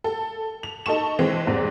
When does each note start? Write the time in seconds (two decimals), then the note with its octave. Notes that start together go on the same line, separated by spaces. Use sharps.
0.04 A4
0.63 F7
0.86 D#4 A4 A5 C#6 E7
1.19 E3 G#3 C4
1.47 E2 G#2 G3 C4